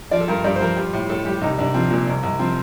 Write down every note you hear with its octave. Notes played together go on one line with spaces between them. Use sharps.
F3 D5
A4
G2 A#4
G2 D5
C5
F3 A#4
G3
A2
A2 A4
G3 G4
C2 D#4
C2 D4
F3 C4
A#2
C2
C2
F3 C4